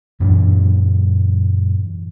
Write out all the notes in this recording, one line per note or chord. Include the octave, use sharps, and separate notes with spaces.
F#2 A#2 E3 D4